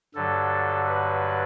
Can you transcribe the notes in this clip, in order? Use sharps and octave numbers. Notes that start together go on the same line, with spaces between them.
G2 D3 F#3 A4
B4